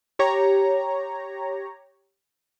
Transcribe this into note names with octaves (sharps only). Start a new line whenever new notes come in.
G4 C#5 A#5